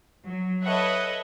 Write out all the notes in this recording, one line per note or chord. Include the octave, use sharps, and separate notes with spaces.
F#3
A4 B4 C#5 D#5 E5 F#5